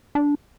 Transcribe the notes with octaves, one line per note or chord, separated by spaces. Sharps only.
D4